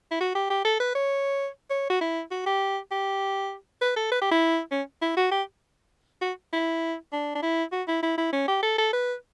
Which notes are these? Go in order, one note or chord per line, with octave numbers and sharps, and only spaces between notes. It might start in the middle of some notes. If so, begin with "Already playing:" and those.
E4
F#4
G4
G4
A4
B4
C#5
C#5
F#4
E4
F#4
G4
G4
B4
A4
B4
G4
E4
C#4
E4
F#4
G4
F#4
E4
D4
D4
E4
F#4
E4
E4
E4
C#4
G4
A4
A4
B4